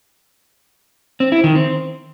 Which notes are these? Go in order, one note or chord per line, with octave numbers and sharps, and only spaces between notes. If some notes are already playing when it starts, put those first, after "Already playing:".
C4
E4
D#3
C4